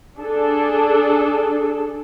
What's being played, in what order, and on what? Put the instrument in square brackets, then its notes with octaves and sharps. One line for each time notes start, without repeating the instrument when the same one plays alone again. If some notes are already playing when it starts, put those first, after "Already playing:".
[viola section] D4 G#4 A4